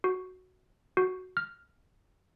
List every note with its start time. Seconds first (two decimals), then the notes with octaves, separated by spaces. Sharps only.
0.04 F#4
0.97 F#4
1.37 F6